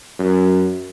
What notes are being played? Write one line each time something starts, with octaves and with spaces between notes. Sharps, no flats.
F#2